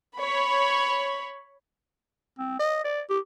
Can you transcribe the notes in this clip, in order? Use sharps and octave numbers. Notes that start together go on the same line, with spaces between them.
C#5 B5
C4
D#5
D5
G4